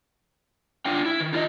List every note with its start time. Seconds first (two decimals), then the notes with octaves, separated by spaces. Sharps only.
0.85 D4 F4 G5
1.06 E4
1.20 D#3
1.33 D#4 F4 D5 D#5